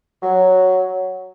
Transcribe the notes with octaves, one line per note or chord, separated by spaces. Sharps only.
F#3